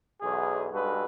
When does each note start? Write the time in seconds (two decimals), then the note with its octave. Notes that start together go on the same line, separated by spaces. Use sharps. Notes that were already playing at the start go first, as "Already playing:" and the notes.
0.21 B1 E2 G#4
0.72 B1 G2 G#3 F#4 A4 B4